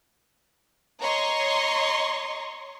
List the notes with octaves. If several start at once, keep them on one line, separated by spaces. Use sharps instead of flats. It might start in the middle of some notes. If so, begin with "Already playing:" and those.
C#5 D#5 A#5 C6 C#6